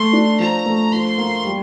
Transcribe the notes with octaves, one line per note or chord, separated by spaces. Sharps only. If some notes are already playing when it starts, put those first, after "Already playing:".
Already playing: A3 C6
D4
F3 A#5
A3
F3 C6
A#3
G3